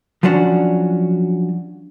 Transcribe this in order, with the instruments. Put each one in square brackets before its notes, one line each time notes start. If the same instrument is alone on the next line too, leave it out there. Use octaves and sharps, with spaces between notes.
[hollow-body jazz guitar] F3 F#3 C#4 D4 F#4